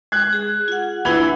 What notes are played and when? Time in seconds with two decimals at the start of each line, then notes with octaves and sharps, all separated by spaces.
0.12 G#3 F#6 G#6
0.33 G#4
0.68 F4 F#5
1.05 E3 D4 E4 F#5 B5 G#6